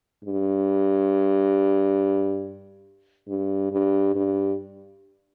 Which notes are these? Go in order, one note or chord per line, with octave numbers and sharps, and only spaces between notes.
G2
G2
G2
G2